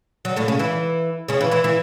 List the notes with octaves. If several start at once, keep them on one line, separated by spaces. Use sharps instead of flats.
F#3
A2 A3
C#3 C#4
E3 E4
C#3 C#4
E3 E4
E3 E4
E3 E4